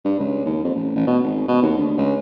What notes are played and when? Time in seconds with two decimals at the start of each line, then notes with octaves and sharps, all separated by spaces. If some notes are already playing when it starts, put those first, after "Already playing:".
0.05 G2
0.19 C#2
0.45 D#2
0.64 F2
0.75 A1
0.95 A1
1.07 B2
1.24 G#1
1.48 B2
1.62 D#2
1.78 D2
1.97 C#2